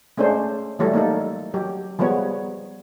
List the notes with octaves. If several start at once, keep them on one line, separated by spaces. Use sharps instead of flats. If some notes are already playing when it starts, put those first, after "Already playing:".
G#3 A3 C#4 D4 C5
E3 F#3 G3 A3 A4 C#5
A#3 D#4 A4
F#3 G4
F3 G3 G#3 B3 C#5